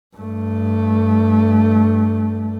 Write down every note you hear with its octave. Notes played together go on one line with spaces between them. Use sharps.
G2 A3